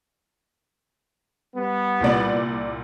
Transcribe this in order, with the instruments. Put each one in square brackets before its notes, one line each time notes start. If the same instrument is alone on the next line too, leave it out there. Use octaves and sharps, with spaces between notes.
[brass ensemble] G3 B3
[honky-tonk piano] C2 A#2 D5